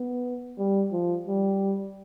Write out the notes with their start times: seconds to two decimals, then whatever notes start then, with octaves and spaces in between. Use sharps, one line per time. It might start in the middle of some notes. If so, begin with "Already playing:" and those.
Already playing: B3
0.58 G3
0.92 F3
1.27 G3